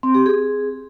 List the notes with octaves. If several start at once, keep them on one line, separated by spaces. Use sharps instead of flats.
C4
G4
G#4